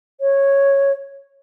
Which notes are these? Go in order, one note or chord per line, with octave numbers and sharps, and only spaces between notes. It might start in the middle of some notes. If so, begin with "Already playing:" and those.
C#5